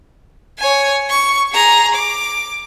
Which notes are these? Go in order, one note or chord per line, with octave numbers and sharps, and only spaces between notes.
C#5 G#5
C#6
G#4 A#5
D6